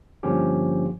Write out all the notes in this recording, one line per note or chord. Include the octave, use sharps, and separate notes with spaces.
G2 D3 F3 A#3 C#4 G4